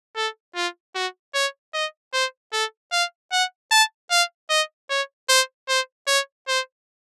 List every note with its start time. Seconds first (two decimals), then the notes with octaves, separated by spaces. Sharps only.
0.16 A4
0.55 F4
0.95 F#4
1.34 C#5
1.74 D#5
2.13 C5
2.53 A4
2.92 F5
3.32 F#5
3.71 A5
4.11 F5
4.49 D#5
4.90 C#5
5.29 C5
5.68 C5
6.07 C#5
6.48 C5